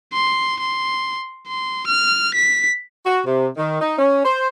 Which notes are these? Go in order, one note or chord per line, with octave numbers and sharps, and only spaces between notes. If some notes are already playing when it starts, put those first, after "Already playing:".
C6
C6
C6
F6
B6
F#4
C3
D#3
D#4
C#4
C5